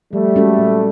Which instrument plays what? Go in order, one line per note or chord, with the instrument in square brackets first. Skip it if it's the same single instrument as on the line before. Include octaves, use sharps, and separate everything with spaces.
[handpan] F3 [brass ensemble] G3 A3
[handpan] G#3 C#4 F#4 A4
A#2